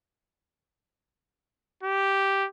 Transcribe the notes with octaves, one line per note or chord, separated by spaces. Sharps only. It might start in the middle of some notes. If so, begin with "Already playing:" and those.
G4